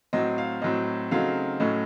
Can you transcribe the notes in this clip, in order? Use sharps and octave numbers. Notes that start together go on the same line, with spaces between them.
A2 F#3 C4 D#5
F5
A2 F#3 C4 D#5
C#3 F#3 A3 C4 D#4 F5
A2 F#3 A3 C#4 D#5